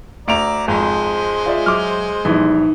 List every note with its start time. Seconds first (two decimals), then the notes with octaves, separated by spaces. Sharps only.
0.28 D2 D5 A#5 D7 F7
0.68 G#1 F2 G#3 C5
1.46 F4 D5 E5
1.66 F#3 E5 D6 F6
2.25 A#1 E3 G3 D#4